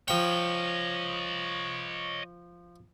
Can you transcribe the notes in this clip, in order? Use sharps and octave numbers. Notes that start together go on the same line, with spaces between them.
F3 C#5 D#5 G5